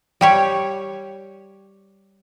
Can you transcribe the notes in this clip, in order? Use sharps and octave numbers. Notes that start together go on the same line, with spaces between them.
G3 G4 C#5